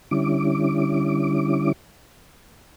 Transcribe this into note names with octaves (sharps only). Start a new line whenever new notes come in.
D3 G3 C#4 E4 D6